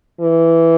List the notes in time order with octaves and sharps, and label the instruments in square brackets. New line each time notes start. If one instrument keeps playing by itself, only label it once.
[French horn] E3